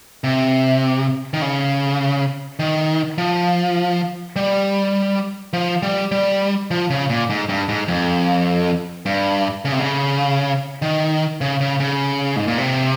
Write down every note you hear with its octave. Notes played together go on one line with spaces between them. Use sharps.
C3
D#3
C#3
D#3
F3
G3
F3
G3
G3
F3
C#3
A#2
G#2
G2
G#2
F2
G2
C#3
C3
C#3
D#3
C#3
C#3
C#3
G#2
A#2
C3